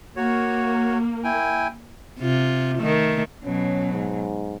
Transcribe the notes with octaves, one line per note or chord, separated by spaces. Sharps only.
A#3 F#4 C#5
E4 G5 G#5
C3 F4
D#3 A3
B2 F#3 C#4
G#2